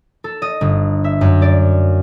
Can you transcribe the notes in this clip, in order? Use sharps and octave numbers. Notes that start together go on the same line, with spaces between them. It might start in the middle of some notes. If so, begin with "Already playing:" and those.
A4
D#5
G1
E5
F#2
D5